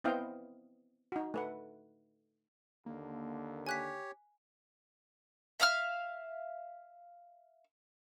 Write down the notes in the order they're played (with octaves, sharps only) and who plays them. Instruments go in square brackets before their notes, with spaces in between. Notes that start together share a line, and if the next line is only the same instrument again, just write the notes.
[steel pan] B3 C4 E4 D#5 F5 G5
D#4 F#4
A3 B4 F#5
[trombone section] D#2 D3 [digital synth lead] A#3
[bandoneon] G4 C#5 [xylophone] G#5 F#6 B6
[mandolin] E5 F5 D#6 F6